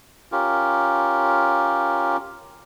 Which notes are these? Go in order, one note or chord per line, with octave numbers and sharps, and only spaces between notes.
C#4 F4 G4 A#4